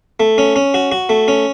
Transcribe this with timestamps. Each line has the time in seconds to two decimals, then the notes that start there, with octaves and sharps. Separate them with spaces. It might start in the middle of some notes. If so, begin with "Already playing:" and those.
0.20 A3
0.38 C#4
0.56 C#4
0.74 F#4
0.92 F#4
1.09 A3
1.28 C#4